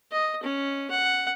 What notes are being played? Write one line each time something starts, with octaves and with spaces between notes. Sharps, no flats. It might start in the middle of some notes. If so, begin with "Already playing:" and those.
D#5
C#4
F#5